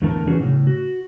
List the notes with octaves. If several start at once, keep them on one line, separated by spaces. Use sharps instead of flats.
E2 A2 D3 A3 A#4 A5
E3 C#4 D#4 F#4 G#4 B4
A2 C#3
F#4